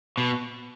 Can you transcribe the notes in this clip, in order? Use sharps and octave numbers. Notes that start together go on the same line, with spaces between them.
B2